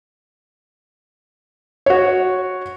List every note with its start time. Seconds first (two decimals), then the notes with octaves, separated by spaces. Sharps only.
1.86 F#4 C#5